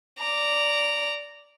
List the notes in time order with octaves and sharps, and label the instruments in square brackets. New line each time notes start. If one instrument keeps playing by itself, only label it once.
[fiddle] D5 A#5